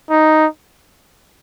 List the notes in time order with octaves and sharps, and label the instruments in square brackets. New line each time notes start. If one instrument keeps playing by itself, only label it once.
[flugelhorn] D#4